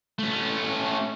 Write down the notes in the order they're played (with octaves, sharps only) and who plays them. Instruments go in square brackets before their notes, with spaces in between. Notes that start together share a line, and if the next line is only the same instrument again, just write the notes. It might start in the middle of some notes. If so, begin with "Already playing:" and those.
[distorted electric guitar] A3 C#4